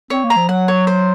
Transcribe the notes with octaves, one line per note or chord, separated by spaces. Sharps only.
C4 C#5
A#3
A#5
F3
F#3 F#5
C#5
C5